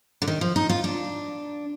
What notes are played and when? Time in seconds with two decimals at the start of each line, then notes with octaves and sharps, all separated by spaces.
0.22 D3
0.28 D#3
0.41 F3
0.56 D#4
0.69 F4
0.84 D4